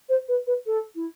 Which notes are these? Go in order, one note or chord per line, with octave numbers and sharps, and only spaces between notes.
C5
B4
B4
A4
E4